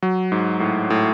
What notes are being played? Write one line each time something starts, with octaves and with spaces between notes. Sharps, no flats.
F#3
G#2
A2
A2